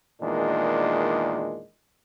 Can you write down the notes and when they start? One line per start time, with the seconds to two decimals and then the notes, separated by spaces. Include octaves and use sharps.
0.22 E2 A#2 D#3 G#3 D4